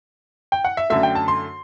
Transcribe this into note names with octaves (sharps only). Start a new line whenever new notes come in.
G5
F#5
E5
F#2 D3 A3 E5
G5
A5
C6